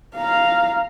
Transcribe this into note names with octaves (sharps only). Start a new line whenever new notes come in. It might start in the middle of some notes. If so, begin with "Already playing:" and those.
F5 A#5